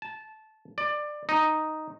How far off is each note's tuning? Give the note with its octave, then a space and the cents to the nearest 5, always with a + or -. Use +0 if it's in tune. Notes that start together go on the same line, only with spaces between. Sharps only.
A5 -15
D5 +20
D#4 +0